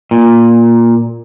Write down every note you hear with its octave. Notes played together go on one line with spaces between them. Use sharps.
A#2